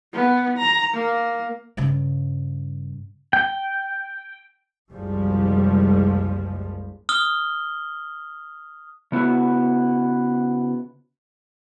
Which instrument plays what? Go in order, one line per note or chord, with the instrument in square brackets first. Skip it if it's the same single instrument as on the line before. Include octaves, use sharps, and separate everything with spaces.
[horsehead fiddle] B3
A#5
A#3
[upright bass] G2 C#3
[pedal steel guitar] G5
[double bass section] F#1 C2 F3 G3 G#3
[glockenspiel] D#6 F6 G7
[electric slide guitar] C#3 B3 E4 F#4